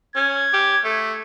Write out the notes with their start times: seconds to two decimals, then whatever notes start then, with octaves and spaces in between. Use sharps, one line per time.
0.16 C#4 G#6
0.53 G4
0.85 A3